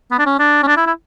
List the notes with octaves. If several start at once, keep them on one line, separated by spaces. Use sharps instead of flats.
B3
D4
C#4
D4
C#4
D4
E4
E4